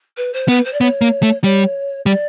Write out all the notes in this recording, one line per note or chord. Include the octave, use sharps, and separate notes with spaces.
B4
C5
B3 B4
C5
D5
B3 C#5
A#3
A3
G3 C#5
G3 D5